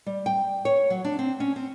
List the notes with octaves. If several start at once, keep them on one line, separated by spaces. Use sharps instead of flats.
G3
G5
C#5
F#3
D4
C4
C#4
C4